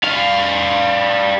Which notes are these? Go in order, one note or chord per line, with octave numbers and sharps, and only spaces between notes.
G3 F5